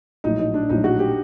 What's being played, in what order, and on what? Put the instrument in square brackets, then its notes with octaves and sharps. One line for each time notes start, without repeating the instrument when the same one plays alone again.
[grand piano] A#1 A2 F#3 [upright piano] D#4
[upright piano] D#4
D4
[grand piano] A#1 A2 F#3 [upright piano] D#4
[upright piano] F#4
G4